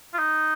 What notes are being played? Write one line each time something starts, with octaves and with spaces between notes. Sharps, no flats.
F4
D#4